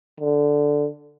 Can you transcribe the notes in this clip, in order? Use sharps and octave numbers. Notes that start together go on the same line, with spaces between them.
D3